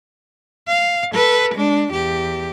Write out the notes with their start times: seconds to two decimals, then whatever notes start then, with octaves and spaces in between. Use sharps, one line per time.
0.67 F5
1.14 A4 B4
1.54 G#3 D4
1.92 E2 G4